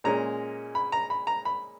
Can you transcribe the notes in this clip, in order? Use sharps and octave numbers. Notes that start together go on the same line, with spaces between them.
A#2 G#3 C#4 A#5
B5
A#5
B5
A#5
B5